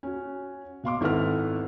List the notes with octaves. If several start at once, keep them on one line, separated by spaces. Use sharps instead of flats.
C#4 F#4
B2 F5 C6 D6
G#1 E4 A4 B4 F#5 F6